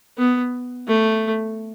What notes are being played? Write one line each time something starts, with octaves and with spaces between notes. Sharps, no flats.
B3
A3